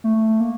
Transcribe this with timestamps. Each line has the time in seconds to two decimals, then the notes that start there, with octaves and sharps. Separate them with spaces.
0.04 A3
0.40 A#3